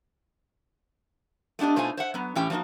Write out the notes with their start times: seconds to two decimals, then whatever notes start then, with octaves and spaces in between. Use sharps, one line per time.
1.59 A3 B3 D4 G4 D#5
1.76 B2 A3 D#4 F4 C5 G#5
1.97 C5 E5 F#5
2.14 F#3 B3
2.35 A2 E3 C#4 G4 G5
2.50 F3 F#3 A#3 D#4 F#4